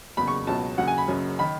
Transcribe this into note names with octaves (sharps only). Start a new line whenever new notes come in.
F#1 E2 C#3 F#3 B5
C#6
C#2 B2 F#3 A5
D#2 C#3 F#3 F#5
G#5
B5
F#1 F#2 C#3 F#3
D#3 B5